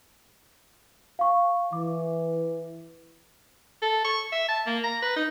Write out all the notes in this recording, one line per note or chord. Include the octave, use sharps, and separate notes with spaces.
F5 C#6
E3 D6
A4
C#6
E5
A5
A#3
A#5
B4
D#4